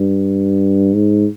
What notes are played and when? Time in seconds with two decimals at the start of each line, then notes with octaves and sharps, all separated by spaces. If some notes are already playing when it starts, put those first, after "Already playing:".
Already playing: G2
0.94 G#2